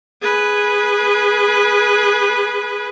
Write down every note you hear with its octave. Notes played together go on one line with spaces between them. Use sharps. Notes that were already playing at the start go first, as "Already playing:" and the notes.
G#4 B4